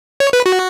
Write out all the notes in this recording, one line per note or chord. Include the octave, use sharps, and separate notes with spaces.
C#5
B4
F#4